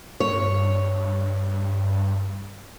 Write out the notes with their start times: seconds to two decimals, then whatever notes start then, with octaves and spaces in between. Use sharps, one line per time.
0.20 G2 C#5